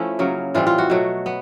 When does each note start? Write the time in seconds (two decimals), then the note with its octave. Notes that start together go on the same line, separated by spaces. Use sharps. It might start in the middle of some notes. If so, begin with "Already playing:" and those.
Already playing: F3 A3 C#4 E4
0.19 C#3 F#3 A#3
0.54 A2 E3 G3 C4 F4
0.67 F4
0.78 F#4
0.90 B2 F#3 A3
1.26 B3